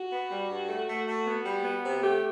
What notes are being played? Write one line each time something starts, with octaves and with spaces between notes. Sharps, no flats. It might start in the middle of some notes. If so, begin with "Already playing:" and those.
Already playing: F#4
B3
G3
G2
A3
A3
A3
B3
G3
B3
C3
A3 G4